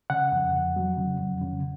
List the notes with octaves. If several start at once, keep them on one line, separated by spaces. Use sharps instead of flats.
C#3 F#5
F2
F2
F#3
C#3
F2
C#3